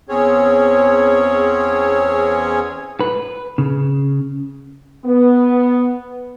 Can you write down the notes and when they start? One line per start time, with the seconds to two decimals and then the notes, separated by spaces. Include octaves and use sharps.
0.09 E2 C4 C#4 G#4 C#5
3.00 B4
3.58 C#3
5.05 B3